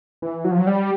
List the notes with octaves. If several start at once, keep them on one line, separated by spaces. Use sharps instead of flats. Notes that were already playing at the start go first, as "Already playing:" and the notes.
E3
F#3
F3
F#3
G3